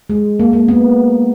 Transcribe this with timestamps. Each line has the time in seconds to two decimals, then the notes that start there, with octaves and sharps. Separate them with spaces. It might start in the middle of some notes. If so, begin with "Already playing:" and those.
0.10 G#3
0.40 A#3
0.53 A#3
0.69 B3